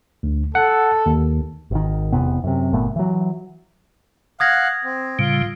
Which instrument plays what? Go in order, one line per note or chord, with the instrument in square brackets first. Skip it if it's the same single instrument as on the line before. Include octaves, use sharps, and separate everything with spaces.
[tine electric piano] D2
[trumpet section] A4 [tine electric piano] F#5
[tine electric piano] D#2
[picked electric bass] G#1 D#3
F1 E2 C3 B3
F#2 C3
G1 A#2 A3 B3
E3 F#3
[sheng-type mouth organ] F5 F#5 [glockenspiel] D#6 G#6 A#6
[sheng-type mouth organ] C4
[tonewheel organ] A2 C#3 G3 [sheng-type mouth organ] F4